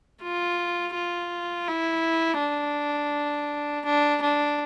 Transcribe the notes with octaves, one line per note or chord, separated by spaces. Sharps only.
F4
F4
E4
D4
D4
D4